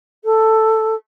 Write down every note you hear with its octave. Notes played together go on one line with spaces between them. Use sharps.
A4